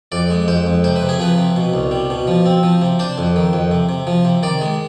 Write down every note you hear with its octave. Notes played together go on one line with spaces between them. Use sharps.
F2 D5
G#3
F2 C5
F2
C3 C5
B4
C3
G#4
F3 B4
C3
B2
C2
G3
B2
F3
C4
F3
C3
D4 C5
F2
D#3
F2
C3
C3
F3
C3
D#3 D5
G#3